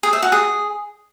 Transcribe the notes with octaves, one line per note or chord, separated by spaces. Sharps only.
G#4
E5
F#4
G#4